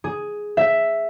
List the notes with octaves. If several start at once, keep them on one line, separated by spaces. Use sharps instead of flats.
G#4
E5